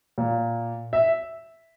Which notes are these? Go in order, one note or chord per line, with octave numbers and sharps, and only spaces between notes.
A#2
E5